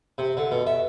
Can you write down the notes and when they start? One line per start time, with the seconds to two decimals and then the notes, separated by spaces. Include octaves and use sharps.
0.18 C3
0.37 D3
0.51 B2
0.67 E5